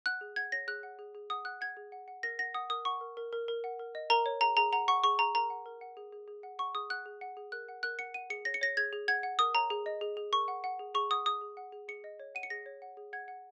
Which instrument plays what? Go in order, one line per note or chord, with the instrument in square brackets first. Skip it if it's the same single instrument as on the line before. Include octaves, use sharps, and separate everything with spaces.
[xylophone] F#5 F#6
G#4
F#5 G#6
C#5 A#6
G#4 F#6
F#5
G#4
G#4
F#5 D#6
F#5 F#6
F#5 G#6
G#4
F#5
F#5
A#4 A#6
F#5 A#6
F#5 D#6
A#4 D#6
F#5 C#6
A#4
A#4
A#4
A#4
F#5
A#4
D#5
A#4 A#5
C#5
G#4 A#5
G#4 A#5
F#5 A#5
F#5 C#6
G#4 C#6
G#4 A#5
A#4 A#5
F#5
A#4
F#5
G#4
G#4
G#4
F#5
F#5 C#6
G#4 D#6
F#5 F#6
G#4
F#5
G#4
A#4 F#6
F#5
A#4 F#6
F#5 C#7
F#5 D#7
G#4 C#7
C#5 A#6
C#7
C#5 A#6
G#4 G#6
G#4
F#5 G#6
F#5
A#4 D#6
C#5 A#5
G#4
D#5
G#4
G#4
A#4 C#6
F#5
F#5
G#4
G#4 C#6
F#5 D#6
G#4 D#6
G#4
F#5
G#4
G#4 C#7
D#5
C#5
F#5 D#7
C#7
G#4 A#6
C#5
F#5
G#4
F#5 G#6
F#5